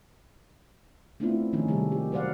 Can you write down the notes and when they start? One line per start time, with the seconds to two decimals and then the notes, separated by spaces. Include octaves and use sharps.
1.20 A3 B3 C4 D4 E4 F4
1.53 D#3 F3 A3 C#4 D#4
1.68 C3 D#3 G3 G#3 G4 A4
1.92 D#4 G4
2.12 F#3 B4 C5 D5 F5 F#5